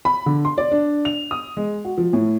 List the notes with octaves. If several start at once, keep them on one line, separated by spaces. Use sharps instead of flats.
B5
D3
C6
D5
D4
F7
D#6
G#3
F#4
F3
A2